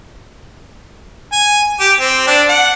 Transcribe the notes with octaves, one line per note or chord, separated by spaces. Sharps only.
G#5
G4
C4
D4
F#5